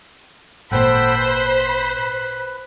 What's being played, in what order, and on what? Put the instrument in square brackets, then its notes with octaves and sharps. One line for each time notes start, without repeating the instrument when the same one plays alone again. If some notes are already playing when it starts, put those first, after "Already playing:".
[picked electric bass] G#1 A#2 [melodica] A4 F#5 G5 [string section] C5 B5
[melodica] B4